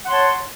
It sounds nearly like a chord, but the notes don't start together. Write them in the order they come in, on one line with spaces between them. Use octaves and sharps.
F#5 C6 C#5 A5